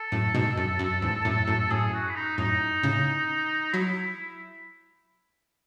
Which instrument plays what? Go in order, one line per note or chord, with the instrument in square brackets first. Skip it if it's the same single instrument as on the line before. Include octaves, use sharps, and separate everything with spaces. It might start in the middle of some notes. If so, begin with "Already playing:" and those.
Already playing: [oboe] A4
[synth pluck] F#2 A2
G#2 B2
F#2
F#2
E2 G#2
F#2 A2
F#2 A2
[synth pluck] F#2 A2 [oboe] G#4
[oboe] F#4
E4
D#4
[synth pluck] F#2 A2 [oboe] D#4
[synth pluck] A2 C#3
[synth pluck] F#3 [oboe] E4